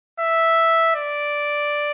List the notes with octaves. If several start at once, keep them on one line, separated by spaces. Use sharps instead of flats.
E5
D5